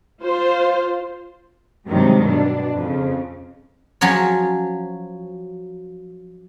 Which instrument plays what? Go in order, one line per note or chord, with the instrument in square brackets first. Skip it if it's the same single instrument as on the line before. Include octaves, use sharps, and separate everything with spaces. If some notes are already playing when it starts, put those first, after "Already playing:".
[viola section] F4 C5
[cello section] G2 C3 D#3 F#3 G#3
B2 D4
F2 C#3
[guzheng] F3 F#3 C#4 C#5